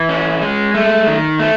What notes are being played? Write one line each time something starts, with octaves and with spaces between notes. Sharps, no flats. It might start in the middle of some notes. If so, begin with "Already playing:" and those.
Already playing: E3
C#4
G#3
A3
D#3
A3